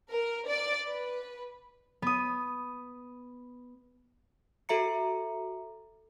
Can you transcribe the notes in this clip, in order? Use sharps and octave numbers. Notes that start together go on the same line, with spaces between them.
A#4
D5
B4
B3 D#6
F#4 A4 E5 A#5 C#7